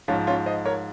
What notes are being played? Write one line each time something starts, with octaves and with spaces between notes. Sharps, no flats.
G#2 F3 C#4 F4
C#4 F4
C5 D#5
A#4 C#5